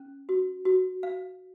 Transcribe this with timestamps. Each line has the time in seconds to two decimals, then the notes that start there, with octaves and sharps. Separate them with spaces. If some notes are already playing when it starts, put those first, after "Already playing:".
Already playing: C#4
0.29 F#4
0.65 F#4
1.03 F5